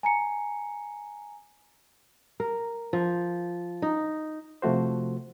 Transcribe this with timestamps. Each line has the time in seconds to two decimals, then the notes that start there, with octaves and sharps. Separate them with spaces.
0.03 G#5 A#5 C#7
2.40 A#4
2.93 F3
3.82 D#4
4.62 C3 F3 A3 F#4 C5